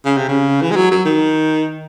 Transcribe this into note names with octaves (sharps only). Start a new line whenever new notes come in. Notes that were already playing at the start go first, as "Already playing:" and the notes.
C#3
C3
C#3
E3
G#3
F#3
F#3
D#3